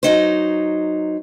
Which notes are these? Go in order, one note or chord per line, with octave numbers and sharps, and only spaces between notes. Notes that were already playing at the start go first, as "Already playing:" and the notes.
F#3 D#4 C5